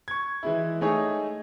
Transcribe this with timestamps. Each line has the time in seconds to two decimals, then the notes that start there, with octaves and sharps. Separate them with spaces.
0.08 C#6 G#6
0.43 E3 G#3 E4
0.81 G#3 A3 D#4 G#4 C#5 D#5